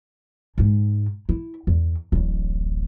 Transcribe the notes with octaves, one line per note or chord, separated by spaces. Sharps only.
G#2 G#3
E4
E2
D1 A1